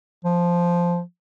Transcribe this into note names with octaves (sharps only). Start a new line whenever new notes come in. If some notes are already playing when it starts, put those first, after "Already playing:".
F3